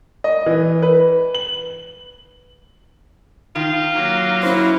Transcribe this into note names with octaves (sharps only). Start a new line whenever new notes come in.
D#5
E3
B4
F#7
D#3 F4
F#3 A#3
C#4 E4 C5